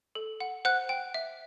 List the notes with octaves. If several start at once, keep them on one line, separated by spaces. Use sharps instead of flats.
A4
F#5
C5 F#5 F#6
G5
E5